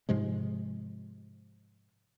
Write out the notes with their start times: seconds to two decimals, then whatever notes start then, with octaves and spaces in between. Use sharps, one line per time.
0.09 G#2 C3 F3 G#3